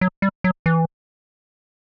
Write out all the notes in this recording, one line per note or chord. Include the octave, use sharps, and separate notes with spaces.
F#3
G3
F#3
E3